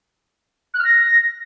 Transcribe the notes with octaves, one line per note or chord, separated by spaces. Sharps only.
F#6
F6
A#6